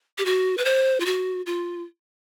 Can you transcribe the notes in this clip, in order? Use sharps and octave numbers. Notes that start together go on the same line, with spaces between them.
G4
F#4
B4
C5
F4
F#4
F4